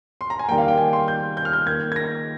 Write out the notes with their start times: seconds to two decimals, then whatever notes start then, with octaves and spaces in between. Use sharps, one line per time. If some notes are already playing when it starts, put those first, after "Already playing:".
0.21 C6
0.30 A#5
0.39 G#5
0.48 D#3 G3 A#3 G5
0.58 F5
0.68 G5
0.78 G#5
0.93 C6
1.08 G6
1.37 G6
1.45 F6
1.53 G6
1.67 D#3 A#3 G#6
1.92 G#6
1.96 A#6